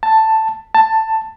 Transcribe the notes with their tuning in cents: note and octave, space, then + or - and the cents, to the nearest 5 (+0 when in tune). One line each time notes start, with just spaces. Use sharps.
A5 +5
A5 +10